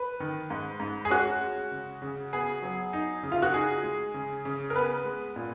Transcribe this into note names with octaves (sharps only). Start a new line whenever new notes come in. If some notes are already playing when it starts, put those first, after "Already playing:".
Already playing: B4
D#3
G#2
G#2
G#4
C#4 F#4
G#3
C#3
C#3
B3 G#4
F#3
D#4
C#3
F4
F#4
D#4 G#4
G#3
C#3
C#3
A#4
B3 B4
G#3
A#2